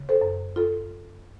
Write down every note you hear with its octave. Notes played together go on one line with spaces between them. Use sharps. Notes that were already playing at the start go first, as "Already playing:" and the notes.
Already playing: C#3
A4 C5
F#2
F4 A4